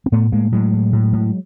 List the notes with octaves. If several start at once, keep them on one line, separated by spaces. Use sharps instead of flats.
C4
A2 A3 B3
A2 G#3 A#3
A2 F#3 G#3
A2
A2
A2